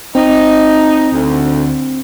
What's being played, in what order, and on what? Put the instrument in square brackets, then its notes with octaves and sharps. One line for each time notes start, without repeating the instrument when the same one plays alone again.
[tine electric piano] C4 [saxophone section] D#4
[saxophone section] D2